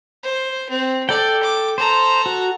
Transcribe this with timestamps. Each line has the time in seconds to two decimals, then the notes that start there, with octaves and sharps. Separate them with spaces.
0.23 C5
0.70 C4
1.09 A4 D5 G5
1.43 D6
1.78 A4 C5 A#5
2.26 F#4